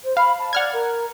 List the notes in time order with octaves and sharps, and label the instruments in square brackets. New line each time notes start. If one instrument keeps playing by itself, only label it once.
[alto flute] C5
[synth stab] F5 [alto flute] B5
[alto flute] A5
[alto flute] D5 [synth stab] F#5 F6 G#6
[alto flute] A#4